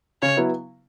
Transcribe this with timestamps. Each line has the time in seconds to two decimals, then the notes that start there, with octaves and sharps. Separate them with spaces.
0.22 C#3 C#5
0.37 F#3 B3 E4